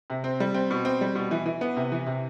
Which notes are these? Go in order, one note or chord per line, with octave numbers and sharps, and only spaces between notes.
C3
C4
G3
C4
B2
C4
G3
B2
E3
E3
B3
C3
E3
C3